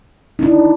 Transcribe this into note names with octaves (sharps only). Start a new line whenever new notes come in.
D#4
D4 E4